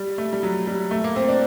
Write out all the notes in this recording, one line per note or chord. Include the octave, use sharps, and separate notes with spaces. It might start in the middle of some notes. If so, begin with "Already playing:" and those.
Already playing: G3
A3
G3
F#3
G3
A3
A#3
C4
D4